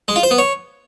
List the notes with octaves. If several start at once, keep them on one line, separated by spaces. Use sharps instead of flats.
G#3
F4
C5
B3
C#5